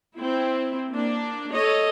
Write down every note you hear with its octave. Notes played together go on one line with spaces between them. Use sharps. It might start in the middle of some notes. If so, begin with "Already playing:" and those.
C4 E4
A#3 D4
A4 C#5 D#5